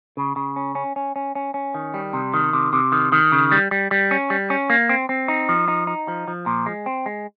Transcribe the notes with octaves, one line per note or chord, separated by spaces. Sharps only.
C#3
C#3
C#4
C#4
C#4
C#4
C#4
C#4
D#3
G3
C3
D#3
C3
C3
D#3
D#3
C#3
G3
G3
G3
C#4
G3
C#4
A#3
C4
C4
D#4
F3
D#4
D#4
F3
F3
A#2
G#3
C4
G#3